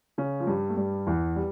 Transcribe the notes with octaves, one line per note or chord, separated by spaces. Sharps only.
C#3 C#4
F3
G2 G3
A3
G2 G3
E2 E3
G3